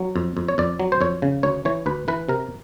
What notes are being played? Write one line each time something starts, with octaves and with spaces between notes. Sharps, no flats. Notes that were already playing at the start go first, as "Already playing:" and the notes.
Already playing: F#3
F2
F2
C#5
F2 D5
F#3
C5
F2 C#5
C#3
D2 C#5
E3 C#5
D2 B4
E3 B4
C3 A#4